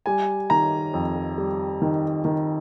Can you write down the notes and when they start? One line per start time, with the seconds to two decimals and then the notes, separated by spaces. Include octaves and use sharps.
0.06 G3 G#5
0.50 D#3 A#5
0.94 F2
1.38 G3
1.82 D#3
2.25 D#3